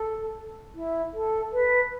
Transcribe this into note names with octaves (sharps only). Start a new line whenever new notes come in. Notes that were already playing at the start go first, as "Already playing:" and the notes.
Already playing: A4
E4
A4
B4